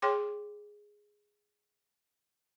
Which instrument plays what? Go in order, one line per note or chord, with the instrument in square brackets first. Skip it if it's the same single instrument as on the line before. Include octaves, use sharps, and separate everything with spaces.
[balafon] G#4 C#5 G5 C6 D6